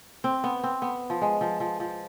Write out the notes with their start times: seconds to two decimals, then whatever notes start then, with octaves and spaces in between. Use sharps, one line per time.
0.24 C4
0.44 B3
0.64 C4
0.82 B3
1.10 F3
1.22 G#3
1.41 F3
1.60 F3
1.80 F3